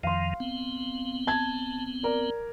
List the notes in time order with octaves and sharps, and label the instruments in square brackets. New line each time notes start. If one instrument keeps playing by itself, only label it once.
[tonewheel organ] F2 D#3 F3 [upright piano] F5 C6
[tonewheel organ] B3 C4
[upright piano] A5 G#6
A#4 D5